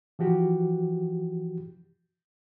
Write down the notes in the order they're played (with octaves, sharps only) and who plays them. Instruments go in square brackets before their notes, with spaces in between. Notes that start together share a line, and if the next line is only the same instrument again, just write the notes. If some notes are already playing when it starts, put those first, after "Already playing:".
[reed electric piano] E3 F3 F#4 G4